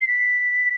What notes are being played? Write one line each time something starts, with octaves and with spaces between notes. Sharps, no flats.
C7
B6